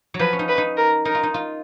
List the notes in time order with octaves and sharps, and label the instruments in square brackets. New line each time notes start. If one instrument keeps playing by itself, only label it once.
[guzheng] F#3
[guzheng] F3 [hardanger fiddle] B4
[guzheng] C#4
D#4
[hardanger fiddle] B4
[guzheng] D#4
[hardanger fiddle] A#4
[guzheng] D#4 [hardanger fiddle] A#4
[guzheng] F4
D#4
F4